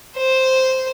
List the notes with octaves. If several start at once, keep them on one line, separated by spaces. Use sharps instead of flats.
C5